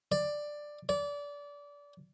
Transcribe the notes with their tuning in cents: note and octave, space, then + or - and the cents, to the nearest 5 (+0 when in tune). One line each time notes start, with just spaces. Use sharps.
D5 +10
D5 -25